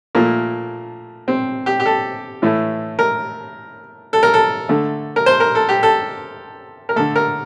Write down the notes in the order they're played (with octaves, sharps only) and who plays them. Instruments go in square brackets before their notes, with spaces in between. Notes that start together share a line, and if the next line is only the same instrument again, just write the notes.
[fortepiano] A#2 F3 A3 A#3
C4
G4
G4
A4
A2 E3 A3
A#4
A4
A#4
A4
D3 A3
A#4
C5
A#4
A4
G4
A4
A#4
D3 A3 A4
A#4